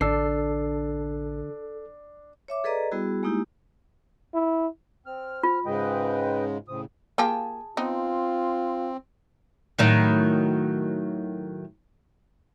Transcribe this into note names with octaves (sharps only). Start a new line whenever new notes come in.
A1 D3 D4 A4 C7
C#5 E5 D6
G#4 A4 B4 D5 D#5 A#5
G3 B3 E4 F#4 G#4
G#3 A#3 D#4 E4 G4
E4
C4 F6
F4
G#2 C#3 G#3 B4 D#5 G5
A2 C#3 C4 D#6
A#3 F4 G4 G#4 G#5 A5
B3 C4 D#4 F4
A2 D#3 F#3